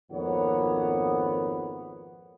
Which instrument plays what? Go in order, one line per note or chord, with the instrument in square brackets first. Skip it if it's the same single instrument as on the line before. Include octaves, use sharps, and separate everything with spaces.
[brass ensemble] G#1 F2 A#3 B3 C#5 F#5